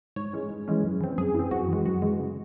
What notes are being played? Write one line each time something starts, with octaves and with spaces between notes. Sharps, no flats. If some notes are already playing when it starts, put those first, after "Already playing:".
G#2 C#5
E3 G#3 C#4
G#2
E3 G#3 C#4
F#2
E3 C4
F#2 G#4
E3 C4
F#2 F#4
E3 G#3
F#2 F#4
E3 G#3
C#3